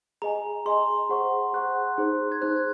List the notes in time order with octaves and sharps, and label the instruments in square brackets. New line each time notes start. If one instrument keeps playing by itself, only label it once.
[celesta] G#4 D#5 G#5 [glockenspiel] A#5
[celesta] G#4 D#5 G#5 [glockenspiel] C6
[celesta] G#4 C5 F#5 C#6
[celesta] G#4 C5 F#5 C#6 [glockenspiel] F#6
[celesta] D#4 G#4 C5
[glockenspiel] G#6
[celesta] D#4 G#4 C5 [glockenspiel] F#6
[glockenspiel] G#6